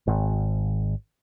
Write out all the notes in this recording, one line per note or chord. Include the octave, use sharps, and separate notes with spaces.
G#1